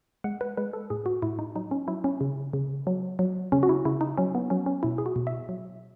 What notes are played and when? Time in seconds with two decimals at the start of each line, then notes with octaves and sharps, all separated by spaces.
0.24 G#3 F#5
0.41 B4
0.57 G#3 B4
0.73 A4
0.90 A2 G#4
1.06 F#4
1.22 A2 E4
1.39 D#4
1.55 F#3 D#4
1.71 C#4
1.88 F#3 E4
2.04 C#4
2.21 C#3
2.53 C#3
2.87 F#3
3.19 F#3
3.52 C#3 C#4
3.63 F#4
3.69 E4
3.85 C#3 E4
4.01 D#4
4.18 F#3 C#4
4.35 B3
4.50 F#3 C#4
4.66 C#4
4.83 B2 E4
4.98 G#4
5.06 F#4
5.16 B2
5.27 E5
5.49 F#3